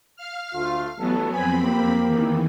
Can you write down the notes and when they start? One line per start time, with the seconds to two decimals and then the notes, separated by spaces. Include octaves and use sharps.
0.16 F5 F6
0.55 D2 A3 F4
0.98 A1 F#3 B3 C#4 A4
1.31 F2 C4 G#5 B5
1.63 A#3 G4
2.07 E2 D#3 E3